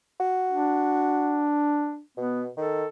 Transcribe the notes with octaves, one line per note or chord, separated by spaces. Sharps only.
F#4
D4
B2 B3
D#3 A4